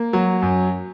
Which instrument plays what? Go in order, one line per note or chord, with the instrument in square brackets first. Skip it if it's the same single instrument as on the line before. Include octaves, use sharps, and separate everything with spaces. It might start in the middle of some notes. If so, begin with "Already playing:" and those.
Already playing: [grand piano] A#3
F#3
F#2